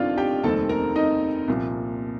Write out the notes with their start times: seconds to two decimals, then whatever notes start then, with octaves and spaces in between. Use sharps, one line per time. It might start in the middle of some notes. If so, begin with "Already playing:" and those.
Already playing: A1 G2 D#3 A3 C4 D4 F4 F5
0.17 G4 G5
0.43 F1 D#2 D#3 G3 C4 A4 A5
0.69 A#4 A#5
0.96 D#4 D#5
1.48 C2 A#2 F3